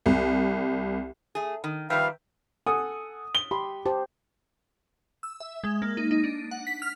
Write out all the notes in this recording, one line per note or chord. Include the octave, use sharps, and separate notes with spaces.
C2
A3 G#4
D#3
D#3 F3 G3 B4 E5 F5 G5
A4 F#5 G#5 D#6
G7
G4 B5 C6
G4 C5 A5
E6
E5
G#3
A#3
D#4
D#4
D4
F#5
B6
F6